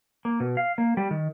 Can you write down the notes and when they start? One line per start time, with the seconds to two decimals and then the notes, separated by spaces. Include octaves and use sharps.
0.25 A#3
0.40 B2
0.57 F5
0.78 A#3
0.97 G3
1.11 D#3